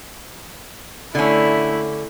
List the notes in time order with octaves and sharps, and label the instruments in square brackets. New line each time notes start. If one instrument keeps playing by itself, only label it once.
[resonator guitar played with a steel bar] D3 C#4 [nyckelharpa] A3 E4